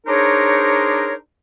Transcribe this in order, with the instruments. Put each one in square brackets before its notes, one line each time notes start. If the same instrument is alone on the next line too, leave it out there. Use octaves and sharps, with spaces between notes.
[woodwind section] D4 D#4 G#4 A#4 C5 C#5